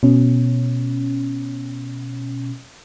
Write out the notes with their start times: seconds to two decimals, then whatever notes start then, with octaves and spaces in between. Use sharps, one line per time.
0.03 B2 C#4